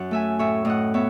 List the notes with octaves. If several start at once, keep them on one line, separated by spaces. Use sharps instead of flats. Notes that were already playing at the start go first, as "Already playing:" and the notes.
Already playing: F#2 F#5
A3 E5 G#5
A2 C#5 E5
A2 D#5 F#5
B3 C#5 E5